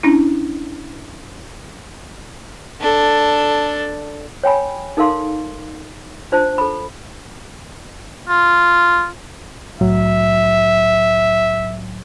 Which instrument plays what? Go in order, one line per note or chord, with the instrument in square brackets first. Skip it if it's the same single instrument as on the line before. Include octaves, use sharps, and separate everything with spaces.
[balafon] C#4 D4 E4
[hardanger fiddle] D4 A4
[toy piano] C#5 G5 G#5 B5
D#4 A4 A#4 F5 C6
D4 F4 C5 A5
A4 B5
[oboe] F4
[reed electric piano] C2 A2 F#3 [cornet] E5